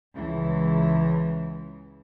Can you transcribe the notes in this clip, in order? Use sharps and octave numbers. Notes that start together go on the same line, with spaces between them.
C#2 E3